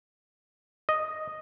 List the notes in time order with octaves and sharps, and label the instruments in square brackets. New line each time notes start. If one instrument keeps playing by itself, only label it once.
[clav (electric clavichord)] D#5